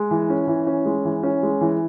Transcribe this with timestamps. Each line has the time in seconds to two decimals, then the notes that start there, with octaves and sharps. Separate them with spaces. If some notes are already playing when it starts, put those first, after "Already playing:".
Already playing: G#3
0.11 E3
0.30 C#4
0.48 E3
0.67 C#4
0.85 G#3
1.05 E3
1.23 C#4
1.43 G#3
1.61 E3